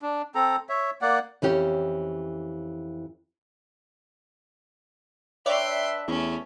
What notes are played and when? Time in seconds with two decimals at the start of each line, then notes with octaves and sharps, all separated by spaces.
0.02 D4
0.35 C4 A4 A#5
0.69 C#5 E5
1.02 A#3 D5 F#5
1.42 F2 E3 C#4 G4
5.46 D4 B4 C#5 D5 E5 G5 C6
6.08 E2 A3 C#4